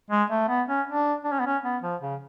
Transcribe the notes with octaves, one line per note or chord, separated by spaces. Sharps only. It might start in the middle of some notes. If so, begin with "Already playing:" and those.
G#3
A3
B3
C#4
D4
D4
C#4
B3
C#4
B3
F3
C#3